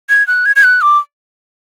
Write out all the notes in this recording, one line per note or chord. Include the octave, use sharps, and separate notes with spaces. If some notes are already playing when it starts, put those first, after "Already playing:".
G#6
F#6
G#6
G#6
F#6
D6